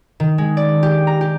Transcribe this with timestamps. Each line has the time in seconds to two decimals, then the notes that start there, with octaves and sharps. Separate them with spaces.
0.20 D#3
0.38 G#3
0.57 D5
0.83 G4
1.07 A#5
1.21 G4